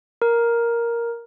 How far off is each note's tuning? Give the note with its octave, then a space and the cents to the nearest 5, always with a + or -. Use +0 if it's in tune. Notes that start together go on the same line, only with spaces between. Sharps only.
A#4 +5